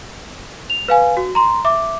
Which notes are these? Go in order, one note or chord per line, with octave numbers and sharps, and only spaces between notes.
F7
B4 F5 G#5
F#4
A#5 C6
E5 D6